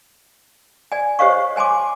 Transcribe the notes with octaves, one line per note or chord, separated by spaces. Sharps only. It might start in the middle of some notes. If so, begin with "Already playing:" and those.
D5 G#5
G4 C5 C#5 D#5 F5 C#6
C#5 G#5 A5 C6 D6